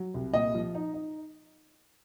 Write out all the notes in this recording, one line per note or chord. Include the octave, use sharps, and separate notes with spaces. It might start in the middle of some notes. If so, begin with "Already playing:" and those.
Already playing: F#3
C2
A#2 D#5
F3
D#4
D#4